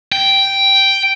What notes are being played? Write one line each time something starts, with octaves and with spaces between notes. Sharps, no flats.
G5